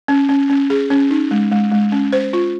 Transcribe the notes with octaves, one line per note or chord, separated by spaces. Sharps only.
C#4
C#4
C#4
G#4
C#4
D#4
G#3
G#3
G#3
C#4
C5
F4